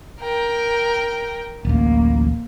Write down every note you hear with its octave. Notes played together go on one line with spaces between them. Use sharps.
A#4 G5
D1 A1 A#3